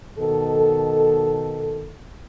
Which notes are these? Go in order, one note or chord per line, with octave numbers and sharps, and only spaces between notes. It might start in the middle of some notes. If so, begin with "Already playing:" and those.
B2 D#3 A4